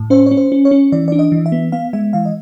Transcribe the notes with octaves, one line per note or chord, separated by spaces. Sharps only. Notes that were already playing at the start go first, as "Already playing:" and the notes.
Already playing: A2
C#4 C5
C#4 C#5
C5
C#4
C#5
C#4
E3 D5
D4 D5
D#5
E3
E5
B3
B3 F5
G#3 E5
E3 F5
D#5